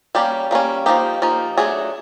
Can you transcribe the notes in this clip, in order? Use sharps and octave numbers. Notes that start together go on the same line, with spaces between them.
G3 A#3 C#4 G4
G3 A#3 C#4
F3 A#3 D#4 G4
F3 A#3 D#4
F#3 A3 D4 G#4